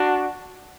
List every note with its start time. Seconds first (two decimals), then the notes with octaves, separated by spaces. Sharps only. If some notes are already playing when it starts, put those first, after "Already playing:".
Already playing: D4 F#4